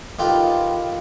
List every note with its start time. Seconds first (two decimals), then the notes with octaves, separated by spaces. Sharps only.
0.19 D#3 F4 G4 A4 B4